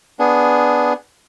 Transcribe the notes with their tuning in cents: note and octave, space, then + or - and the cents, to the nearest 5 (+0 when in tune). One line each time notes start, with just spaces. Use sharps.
B3 +0 D4 +0 G#4 +0